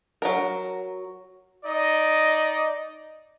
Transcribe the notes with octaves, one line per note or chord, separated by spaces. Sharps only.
F#3 A#4
D#4 D5 D#5